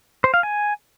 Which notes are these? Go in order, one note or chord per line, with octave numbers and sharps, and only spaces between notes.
C5
F5
G#5